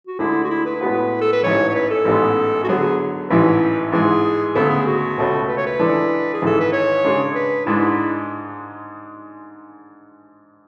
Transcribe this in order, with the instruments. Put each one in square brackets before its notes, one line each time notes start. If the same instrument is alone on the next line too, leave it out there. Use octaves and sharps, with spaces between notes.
[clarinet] F#4
[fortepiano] D2 D3 G#3 D4 G#4 [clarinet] E4
[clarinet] F#4
E4
B4
[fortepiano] A2 G#3 B3 F#4 [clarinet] B4
[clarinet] A4
B4
[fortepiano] A1 G#2 E3 [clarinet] C#5
[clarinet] C#5
B4
A4
[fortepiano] A1 G#2 G#3 B3
[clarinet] F#4
[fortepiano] D3 F#3 B3 [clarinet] G#4
[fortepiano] A1 G#2 E3 [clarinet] B4
[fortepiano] G#2 E3 G#3 [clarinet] G#4
[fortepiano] D2 C#3 G#3 B3 [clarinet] A4
[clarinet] G#4
F#4
[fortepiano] C#2 B2 A3 C#4
[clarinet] B4
C#5
B4
[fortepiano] E3 G#3 D4 A4 D5
[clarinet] G#4
[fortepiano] G#1 G#2 E3 [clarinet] A4
[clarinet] B4
C#5
[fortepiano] C#3 G#3 D4 G#4
[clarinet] B4
[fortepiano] G#2 G#3 D4 [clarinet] E4